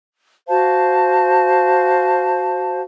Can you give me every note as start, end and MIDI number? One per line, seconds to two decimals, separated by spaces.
0.48 2.81 66
0.48 2.81 72
0.48 2.81 77
0.48 2.81 81